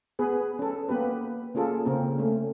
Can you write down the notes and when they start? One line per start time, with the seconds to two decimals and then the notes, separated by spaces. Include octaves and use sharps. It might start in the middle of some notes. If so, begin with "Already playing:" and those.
0.19 B3 G#4 B4
0.59 C#4 A4
0.89 A#3 B3 G4 B4
1.55 A#3 C#4 F4 G#4 A4
1.86 C#3 A#3 C4 A#4
2.18 A3 C#4